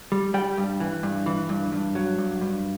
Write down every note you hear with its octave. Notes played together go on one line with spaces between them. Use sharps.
G3
G3 G5
G2
E3
G2
E3
G2
G2
F#3
G2
G2